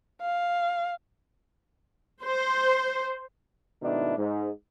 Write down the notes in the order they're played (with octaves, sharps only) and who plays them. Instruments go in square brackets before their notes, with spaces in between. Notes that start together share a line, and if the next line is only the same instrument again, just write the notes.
[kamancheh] F5
[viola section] C5
[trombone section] G#2 B2 D#3 A3 D4 E4
G#2